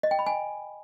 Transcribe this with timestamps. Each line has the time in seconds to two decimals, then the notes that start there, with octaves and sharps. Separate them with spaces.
0.03 D#5
0.11 G5
0.19 B5
0.26 G#5